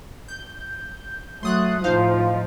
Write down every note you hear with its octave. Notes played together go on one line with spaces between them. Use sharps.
G6
F#3 A3 C6 D#6 F#6
A2 F3 D#4 F4 C5 F5